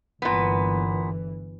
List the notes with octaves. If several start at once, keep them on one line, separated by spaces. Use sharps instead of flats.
G1 A#2 E3 B3